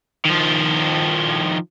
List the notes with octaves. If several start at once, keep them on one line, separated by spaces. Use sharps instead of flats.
D#3 F3